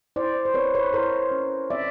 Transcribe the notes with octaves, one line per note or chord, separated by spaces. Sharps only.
E4 C5 D5
C5
C4 B4 C#5
B4 C#5
E4 A#4 C5
C#4
C4 D5 E5